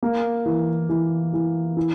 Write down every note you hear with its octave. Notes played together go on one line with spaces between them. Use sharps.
A#3
E3
E3
E3
E4